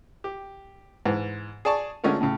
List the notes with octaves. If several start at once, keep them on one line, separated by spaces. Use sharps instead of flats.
G4
G#2 E3
G#4 D5 A5 C#6
D3 G#3 A3 C#4 F4 A#4
A2 C#3